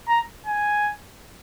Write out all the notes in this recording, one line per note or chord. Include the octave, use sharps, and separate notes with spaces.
A#5
G#5